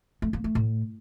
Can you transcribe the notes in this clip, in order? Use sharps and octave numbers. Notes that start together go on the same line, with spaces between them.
A3
A#3
A3
A2